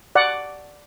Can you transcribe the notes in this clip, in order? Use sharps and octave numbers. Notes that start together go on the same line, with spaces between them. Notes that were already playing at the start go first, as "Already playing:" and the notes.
D5 F#5